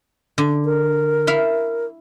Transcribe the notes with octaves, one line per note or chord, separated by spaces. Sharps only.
D3
A#4
E4 E5 F5